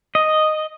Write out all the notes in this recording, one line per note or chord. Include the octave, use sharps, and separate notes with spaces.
D#5